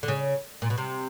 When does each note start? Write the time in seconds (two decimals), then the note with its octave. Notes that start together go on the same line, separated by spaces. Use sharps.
0.03 D3
0.08 C#3
0.62 A#2
0.70 B2
0.78 C3